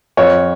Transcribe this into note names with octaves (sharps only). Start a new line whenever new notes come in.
F2 C#5